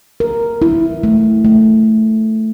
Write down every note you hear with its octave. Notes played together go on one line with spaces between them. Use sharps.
A#4
E4
A3
A3